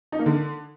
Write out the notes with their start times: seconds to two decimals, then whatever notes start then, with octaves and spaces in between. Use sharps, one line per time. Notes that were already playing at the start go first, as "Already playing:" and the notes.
0.12 D#4
0.19 A#3
0.26 D3